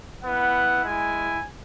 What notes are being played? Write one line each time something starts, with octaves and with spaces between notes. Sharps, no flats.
B3 E4 F#5
G#3 E4 G#5